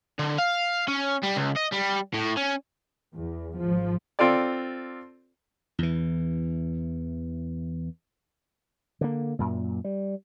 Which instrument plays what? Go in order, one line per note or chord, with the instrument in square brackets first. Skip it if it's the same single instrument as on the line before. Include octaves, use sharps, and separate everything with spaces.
[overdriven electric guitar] D3
F5
C#4
G3
C#2
D#5
G3
A2
C#4
[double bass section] E2
G#1 F3
[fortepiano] C4 F4 A4 D5
[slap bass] E2 E3
D3 A#3
F#2 A#2
G3